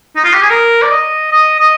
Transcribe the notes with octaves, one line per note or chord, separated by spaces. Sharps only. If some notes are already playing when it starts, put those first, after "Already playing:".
D#4
F4
G4
G#4
A#4
D5
D#5
D#5
D#5